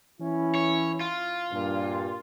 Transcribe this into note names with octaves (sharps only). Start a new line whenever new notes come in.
E3 C#4 E4
C#5
F4
G2 A#2